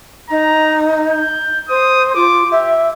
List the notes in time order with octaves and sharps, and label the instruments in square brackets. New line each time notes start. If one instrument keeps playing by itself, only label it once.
[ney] D#4 [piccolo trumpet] A#5
[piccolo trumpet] G6
[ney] C5 [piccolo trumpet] D#6
[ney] F4 [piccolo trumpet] D6
[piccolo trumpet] G4 [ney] E5